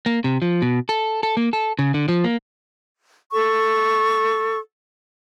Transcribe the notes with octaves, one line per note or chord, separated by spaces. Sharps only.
A#3
C3
F3
B2
A4
A4
A#3
A4
C#3
D3
F3
A#3
A4 C#6